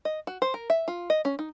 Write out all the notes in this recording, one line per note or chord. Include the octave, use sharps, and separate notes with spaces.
D#5
F#4
C5
A#4
E5
F4
D#5
C#4
D#4